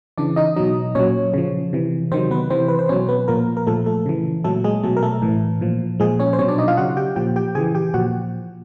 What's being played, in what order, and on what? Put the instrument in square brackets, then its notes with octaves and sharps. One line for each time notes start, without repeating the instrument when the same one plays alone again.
[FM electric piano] C#3 E3 D4 D5
D#4 D#5
B2 F#3 D#4 D#5
A#2 F#3 C#4 C#5
C#3 F3
C3 E3
C3 D#3 F#3 C4 C5
B3 B4
C3 E3 C4 C5
B4
C5
B2 F#3 C#4 C#5
B3 B4
A#2 F3 A#3 A#4
A#4
A#2 F3 A3 A4
A3 A4
C#3 E3
A#2 F#3 A3 A4
G#3 G#4
B2 F#3 A3 A4
A#4
A3 A4
A2 E3
A#2 F3
A#2 F3 G#3 G#4
C#4 C#5
C5
B2 F#3 C#4 C#5
D4 D5
D#4 D#5
F4 F5
C#3 F#3 F#4 F#5
G4 G5
A#2 F3 G4 G5
G4 G5
C#3 G#4 G#5
E3
G4 G5
A#2 F3 F#4 F#5